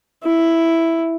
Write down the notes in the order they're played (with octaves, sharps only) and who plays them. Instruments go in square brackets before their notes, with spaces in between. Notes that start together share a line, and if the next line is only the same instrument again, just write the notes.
[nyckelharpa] E4